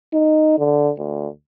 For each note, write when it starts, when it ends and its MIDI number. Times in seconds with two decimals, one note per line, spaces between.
0.13 0.57 63
0.58 0.91 50
0.98 1.28 38